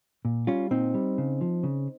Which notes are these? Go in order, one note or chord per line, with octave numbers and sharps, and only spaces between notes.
A#2
G3 C#4 F4
A#2 C4 D#4
G3
C#3
F3
C#3